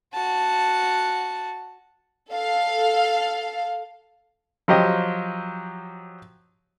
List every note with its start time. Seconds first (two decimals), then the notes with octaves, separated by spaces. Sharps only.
0.14 F#4 A5
2.30 A4 F5
4.68 F3 F#3 G4 D#5